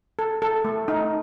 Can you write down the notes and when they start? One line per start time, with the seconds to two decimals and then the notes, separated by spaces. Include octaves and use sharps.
0.19 A4
0.42 A4
0.65 A3
0.88 D#4